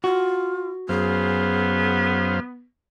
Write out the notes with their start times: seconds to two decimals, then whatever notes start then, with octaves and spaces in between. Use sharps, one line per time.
0.04 F4 F#4
0.89 F#2 B3 G#4 C5 F5